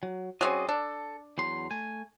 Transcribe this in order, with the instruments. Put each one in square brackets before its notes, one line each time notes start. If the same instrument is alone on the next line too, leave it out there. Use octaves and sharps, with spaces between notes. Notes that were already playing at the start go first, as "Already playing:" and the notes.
[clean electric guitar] F#3
[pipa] F#3 C4 C#4 [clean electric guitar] G#4 D5 D#5
[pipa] D4 [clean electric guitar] A4
[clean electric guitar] E2 F#3 C6
A3 G#5